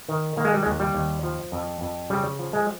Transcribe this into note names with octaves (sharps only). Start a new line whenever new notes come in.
D#3
D#3 A#3
G#3
G3
G#3
D#2
G3
D#2
F3
F2
F2
C#3 G3
F3
G#3